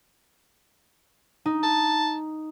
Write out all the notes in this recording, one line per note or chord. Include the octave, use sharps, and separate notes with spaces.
D#4
A5